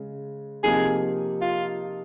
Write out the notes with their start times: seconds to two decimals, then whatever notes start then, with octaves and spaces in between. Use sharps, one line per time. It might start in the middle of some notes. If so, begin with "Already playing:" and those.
Already playing: C#3 G#3
0.64 C3 F3 A#3 D#4 G#4
1.42 F4